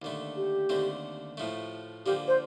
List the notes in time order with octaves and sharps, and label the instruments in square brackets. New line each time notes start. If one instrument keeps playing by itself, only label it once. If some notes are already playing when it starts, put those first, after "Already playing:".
[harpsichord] D#2 D3 A3
[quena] G4
[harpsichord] D#2 D3 A3 C4
A2 F3 A3
[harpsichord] D3 F3 A#3 [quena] G4
[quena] C5